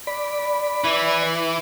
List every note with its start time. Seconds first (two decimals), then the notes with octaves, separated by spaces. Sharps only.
0.07 D5 B5
0.84 E3